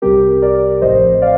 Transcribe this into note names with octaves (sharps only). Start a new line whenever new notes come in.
C2 C3 G3 C4 G4 A#4
A#4 D5
A1 A2 F3 C4 C5 D#5
D5 F5